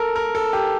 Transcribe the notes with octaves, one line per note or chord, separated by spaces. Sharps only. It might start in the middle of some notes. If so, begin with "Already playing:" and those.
Already playing: A4 A#4
A#4
A4
G4